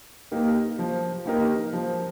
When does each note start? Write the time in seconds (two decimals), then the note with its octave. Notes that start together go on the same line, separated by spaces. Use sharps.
0.31 A#3 D#4 G4 A#4
0.79 F3
1.26 A#3 D#4 G4 A#4
1.73 F3